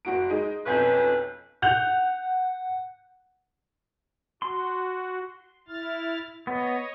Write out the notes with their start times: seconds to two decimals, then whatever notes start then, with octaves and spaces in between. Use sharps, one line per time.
0.05 F#1 F#4 D7
0.30 G#3 D#4
0.66 B1 F2 C#4 B4 G6
1.62 F#5 F#6 G6 F7
4.42 F#4 C6
5.68 E4 F6 A6
6.47 B3 C#5 D#5